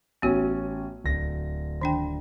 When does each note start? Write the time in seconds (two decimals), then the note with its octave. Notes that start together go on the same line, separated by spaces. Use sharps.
0.22 A1 B3 C#4 F#4 C#5
1.04 D1 A#6
1.81 D#3 D4 G5